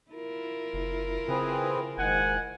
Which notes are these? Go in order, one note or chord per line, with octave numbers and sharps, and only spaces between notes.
E4 F4 A#4
F#1
C#3 C4 G#4 B4
F#1 G#2 D#3 F#5 G#5